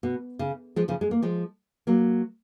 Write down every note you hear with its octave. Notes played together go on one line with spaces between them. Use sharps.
B2
C#3
F3 G#3
C#3 F3
G#3
A#3
F3 G#3
F#3 A#3